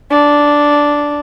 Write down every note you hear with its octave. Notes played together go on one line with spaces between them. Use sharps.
D4